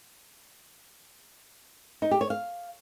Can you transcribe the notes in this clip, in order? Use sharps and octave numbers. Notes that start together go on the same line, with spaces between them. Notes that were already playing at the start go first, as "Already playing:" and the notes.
D#4
G4
C#5
F5